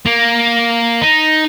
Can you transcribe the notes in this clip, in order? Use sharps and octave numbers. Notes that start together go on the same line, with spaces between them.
A#3
D#4